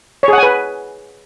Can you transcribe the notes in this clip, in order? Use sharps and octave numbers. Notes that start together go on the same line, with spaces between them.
G#4 B4 C#5 F#5 G#5